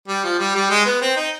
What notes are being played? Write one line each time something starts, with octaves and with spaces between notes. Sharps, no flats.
G3
F3
G3
G3
G#3
B3
C4
D#4